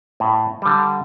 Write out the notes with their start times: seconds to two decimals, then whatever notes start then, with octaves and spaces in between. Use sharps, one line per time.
0.20 A2
0.62 D3 G3